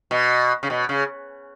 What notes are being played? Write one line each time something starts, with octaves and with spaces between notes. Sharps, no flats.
B2
C#3
B2
C#3